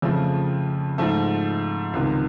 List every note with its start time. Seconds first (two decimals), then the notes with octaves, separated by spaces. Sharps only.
0.02 F2 C#3 F3 A3
0.98 G#2 F3 A3
1.93 C#2 C3 D#3